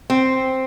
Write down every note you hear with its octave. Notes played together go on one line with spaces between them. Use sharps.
C4